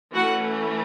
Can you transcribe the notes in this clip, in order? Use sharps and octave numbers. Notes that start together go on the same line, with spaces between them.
E3 A3 C#4 F#4 F#5